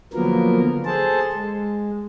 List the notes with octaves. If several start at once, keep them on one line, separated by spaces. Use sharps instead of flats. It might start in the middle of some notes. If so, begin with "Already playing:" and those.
D3 F3 F#3 A#3 B3 A#4
G#4 A4 C5 A5
G#3